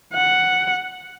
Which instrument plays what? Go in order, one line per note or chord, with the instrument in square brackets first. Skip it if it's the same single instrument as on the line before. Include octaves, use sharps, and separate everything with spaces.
[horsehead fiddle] F#5